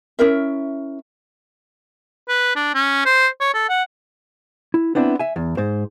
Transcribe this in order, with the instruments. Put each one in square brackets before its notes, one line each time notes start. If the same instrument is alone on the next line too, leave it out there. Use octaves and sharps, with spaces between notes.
[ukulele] C#4 E4 A#4 E5
[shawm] B4
D4
C#4
C5
C#5
A4
F#5
[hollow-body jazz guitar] E4
B3 C4 D4 E4
E5 G#5
E2
G#2 C5